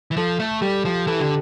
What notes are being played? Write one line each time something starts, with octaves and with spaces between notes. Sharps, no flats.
E3
F3 A4
A3
G3 G4
F3
E3 A4
D3 G4